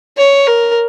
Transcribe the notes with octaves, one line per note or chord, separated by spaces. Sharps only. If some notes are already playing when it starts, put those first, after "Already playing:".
C#5
A#4